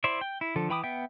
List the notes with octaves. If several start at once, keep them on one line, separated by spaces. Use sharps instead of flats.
E4 C5 D5 E5
G5
E4
D3 F3 A4
E3 G5 B5 D6 D#6
B3 E5 G5